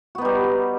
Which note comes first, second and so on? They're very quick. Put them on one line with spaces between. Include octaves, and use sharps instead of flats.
F#4 B3 D#4 G3